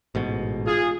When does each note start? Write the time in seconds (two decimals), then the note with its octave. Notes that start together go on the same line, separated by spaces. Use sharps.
0.15 A1 G#2 B2
0.67 F4 G#4